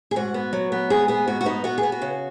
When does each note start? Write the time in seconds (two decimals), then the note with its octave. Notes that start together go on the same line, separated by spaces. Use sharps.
0.11 G#4
0.16 G#2 F#4
0.34 B3
0.53 F#3
0.72 B3
0.90 G#2 G#4
1.08 B3 G#4
1.27 G#2 F#4
1.41 F#4
1.46 B3 D#4
1.64 B3 F#4
1.78 G#4
1.83 B3
1.92 F#4
2.02 C#3